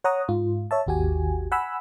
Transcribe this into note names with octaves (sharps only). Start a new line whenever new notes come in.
C#5 F#5 A#5 D#6
G#2 F4
C#5 E5 A5
G#1 D#2 F#4 G4 G#5
F#5 G#5 B5 E6